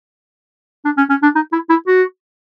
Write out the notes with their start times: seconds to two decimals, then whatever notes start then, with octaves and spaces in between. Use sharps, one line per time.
0.85 D4
0.98 C#4
1.10 C#4
1.23 D4
1.35 D#4
1.52 E4
1.70 E4
1.87 F#4